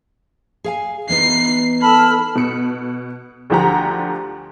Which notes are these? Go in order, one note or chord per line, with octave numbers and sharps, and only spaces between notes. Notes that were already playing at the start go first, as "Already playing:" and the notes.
G#4 F5 G#5
E3 B3 D#4 C7
A4 A5 B5 E6 F6
B2 C#7
D2 D3 F3 G4 F#5 A#5